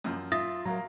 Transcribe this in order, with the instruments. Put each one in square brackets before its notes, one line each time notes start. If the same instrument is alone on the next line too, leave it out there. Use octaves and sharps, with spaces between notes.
[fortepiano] F#2 F3
[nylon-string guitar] F4 [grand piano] E5 [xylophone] D#6 A6 A#6
[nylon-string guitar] F#3 [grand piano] A#4 F5 A#5